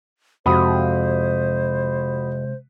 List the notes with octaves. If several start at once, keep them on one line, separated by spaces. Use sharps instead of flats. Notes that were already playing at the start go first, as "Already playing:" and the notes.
F2 C3 G#3 F#4 C5 E5 B5 D#6